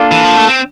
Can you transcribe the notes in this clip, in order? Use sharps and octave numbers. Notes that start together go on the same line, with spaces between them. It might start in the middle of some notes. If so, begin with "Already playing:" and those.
Already playing: A#3 D4 F4 A4
E3
F3
A3
C4